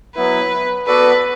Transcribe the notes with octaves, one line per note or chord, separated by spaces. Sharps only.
F#3 B3 E4 B4
B3 F#4 A4 B4 D5